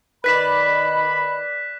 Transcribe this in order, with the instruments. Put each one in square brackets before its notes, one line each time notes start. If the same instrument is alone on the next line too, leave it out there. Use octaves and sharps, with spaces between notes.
[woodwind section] D#3 B5 [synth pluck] B4 D5 [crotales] F#6 B6 E7